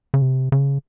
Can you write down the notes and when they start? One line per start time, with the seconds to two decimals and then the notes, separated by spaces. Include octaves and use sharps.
0.14 C#3
0.22 C3
0.52 C#3